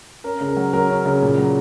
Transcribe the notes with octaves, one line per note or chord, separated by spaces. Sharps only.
C#4 A#4
C#3
A#4
F#3
F#3 A#4
C#4
C#3
A#2
F#3